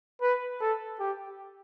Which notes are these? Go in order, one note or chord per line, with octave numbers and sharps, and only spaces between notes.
B4
A4
G4